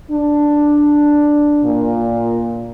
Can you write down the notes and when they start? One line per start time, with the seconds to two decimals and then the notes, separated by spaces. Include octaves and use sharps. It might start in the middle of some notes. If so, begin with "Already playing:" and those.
0.11 D4
1.64 A#2